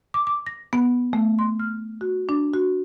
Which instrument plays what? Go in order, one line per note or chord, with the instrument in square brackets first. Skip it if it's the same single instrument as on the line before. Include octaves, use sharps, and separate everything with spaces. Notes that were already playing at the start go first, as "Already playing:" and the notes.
[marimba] D6
D6
A#6
B3
A3
C6
F6
F#4
D4
F#4